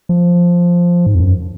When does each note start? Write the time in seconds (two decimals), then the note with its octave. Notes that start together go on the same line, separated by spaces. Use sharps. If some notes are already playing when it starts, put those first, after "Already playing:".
0.09 F3
1.06 G#2
1.15 F2
1.20 F#2